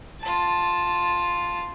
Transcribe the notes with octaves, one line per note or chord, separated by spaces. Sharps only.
F4 A5